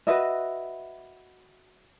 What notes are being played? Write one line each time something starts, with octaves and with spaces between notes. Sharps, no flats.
F#4 B4 D#5 E5